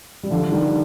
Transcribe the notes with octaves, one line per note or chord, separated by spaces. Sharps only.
G3
D3 F3
D#3 G3